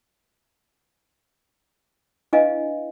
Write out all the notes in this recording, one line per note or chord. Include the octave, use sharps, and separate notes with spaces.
D4 E4 B4 D#5 F5 G#5